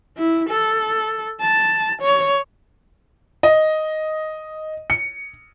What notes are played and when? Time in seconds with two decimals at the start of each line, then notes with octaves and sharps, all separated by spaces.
0.17 E4
0.49 A4
1.41 A5
2.02 C#5
3.43 D#5
4.90 C#7